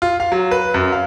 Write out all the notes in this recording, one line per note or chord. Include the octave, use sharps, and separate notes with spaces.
F4
F5
F#3
B4
F#2
F5